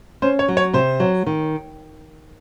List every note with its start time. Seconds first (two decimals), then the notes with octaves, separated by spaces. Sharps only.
0.22 C#4 C5
0.39 C#5
0.48 F#3
0.57 C#5
0.73 C3 C5
1.00 F#3
1.26 D#3